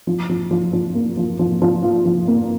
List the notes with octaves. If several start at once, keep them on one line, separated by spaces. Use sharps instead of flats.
F3
F3
F3
F3
A#3
F3
F3
F3
F4
F3
A#3